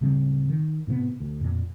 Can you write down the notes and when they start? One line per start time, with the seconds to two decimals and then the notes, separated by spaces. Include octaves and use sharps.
0.01 D1 C#3 G3 C4
0.50 D#3
0.87 A2 C3 A#3 B3
1.20 D2
1.41 F2 A#2